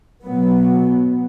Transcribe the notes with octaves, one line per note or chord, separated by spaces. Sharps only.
B2 F#3 B3